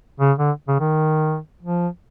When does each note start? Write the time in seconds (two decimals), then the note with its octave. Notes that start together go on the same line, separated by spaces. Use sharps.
0.20 C#3
0.38 D3
0.68 C#3
0.80 D#3
1.63 F3